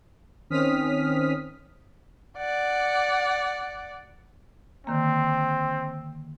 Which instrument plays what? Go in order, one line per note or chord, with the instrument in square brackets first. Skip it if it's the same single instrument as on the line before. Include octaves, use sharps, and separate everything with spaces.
[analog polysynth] D#3 C4 C#4 D#6 F6 B6
[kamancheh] D5 F#5
[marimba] D3 D#3 A#3 [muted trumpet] C4